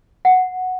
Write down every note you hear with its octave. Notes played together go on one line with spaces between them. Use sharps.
F#5